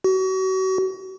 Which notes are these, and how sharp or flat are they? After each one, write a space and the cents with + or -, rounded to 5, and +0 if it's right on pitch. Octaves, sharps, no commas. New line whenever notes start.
F#4 +35